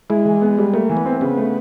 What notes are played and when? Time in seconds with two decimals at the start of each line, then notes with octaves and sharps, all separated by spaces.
0.10 G#3 E4
0.25 E3
0.41 B3
0.58 G3
0.73 A3 A#3
0.89 E3
0.97 B3
1.06 C4
1.21 C#3 B3
1.37 A3